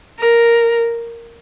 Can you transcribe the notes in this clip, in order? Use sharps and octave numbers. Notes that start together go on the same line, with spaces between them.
A#4